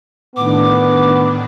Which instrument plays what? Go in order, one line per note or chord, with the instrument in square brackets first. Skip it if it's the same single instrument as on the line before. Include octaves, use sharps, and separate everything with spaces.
[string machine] A2 D#3 D4 [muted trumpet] B3 [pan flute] D6